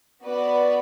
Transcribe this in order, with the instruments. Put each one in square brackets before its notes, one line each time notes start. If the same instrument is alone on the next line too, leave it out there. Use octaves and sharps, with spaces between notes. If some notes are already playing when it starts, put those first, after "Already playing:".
[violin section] B3 F#4 B4 D5